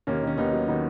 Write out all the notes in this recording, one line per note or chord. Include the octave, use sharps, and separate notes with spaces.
D#2 A#3 C#4
D#3 C#4
D#2 B3 D#4
F#3
D#3 B3 D#4